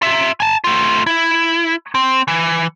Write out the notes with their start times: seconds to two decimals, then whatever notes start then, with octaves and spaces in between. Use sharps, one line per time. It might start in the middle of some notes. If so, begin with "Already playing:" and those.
0.02 F4 E5
0.40 G#5 A5
0.64 A3 F4
1.07 E4
1.95 C4
2.28 E3